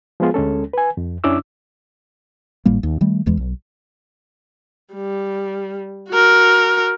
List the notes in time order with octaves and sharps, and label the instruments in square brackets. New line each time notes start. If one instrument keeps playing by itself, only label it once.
[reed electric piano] F3 G#3 B3 F4 G#4
D2 G#3 C#4 A4
B4 G#5
F2
F#2 C#4 D4 E4 D6 E6
[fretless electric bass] G#1 A2 G3 A#3
D#2
D#3 G3 A3
D1 E2 E3 G#3
B1
[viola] G3
F#4 A#4